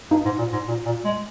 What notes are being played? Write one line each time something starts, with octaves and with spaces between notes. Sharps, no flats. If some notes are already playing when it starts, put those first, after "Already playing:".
G2 D#4
G#2
A#2
G#2
A#2
A#2
G#3